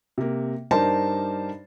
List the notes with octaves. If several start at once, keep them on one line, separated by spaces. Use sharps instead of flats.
C3 A#3
G2 D4 D#4 A#4 C5 A5